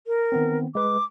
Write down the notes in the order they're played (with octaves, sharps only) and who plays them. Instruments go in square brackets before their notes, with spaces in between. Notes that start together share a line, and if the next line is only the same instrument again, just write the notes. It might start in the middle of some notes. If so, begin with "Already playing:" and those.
[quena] A#4
[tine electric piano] D#3 B3 C4
[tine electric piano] G#3 B4 [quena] D6